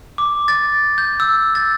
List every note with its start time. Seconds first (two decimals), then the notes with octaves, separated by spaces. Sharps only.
0.18 D6
0.48 A6
0.98 G6
1.20 E6
1.55 A6